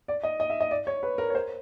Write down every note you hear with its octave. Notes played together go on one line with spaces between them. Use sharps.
D5
D#5
D#5
E5
D#5
D5
C#5
B4
A#4
C#5
C5